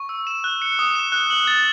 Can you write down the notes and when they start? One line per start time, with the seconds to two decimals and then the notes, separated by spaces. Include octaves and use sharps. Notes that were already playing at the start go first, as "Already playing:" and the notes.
Already playing: C#6
0.09 E6
0.27 E7
0.44 F#6
0.62 C#7
0.79 D#6
0.95 E7
1.12 F#6
1.30 F#7
1.47 A6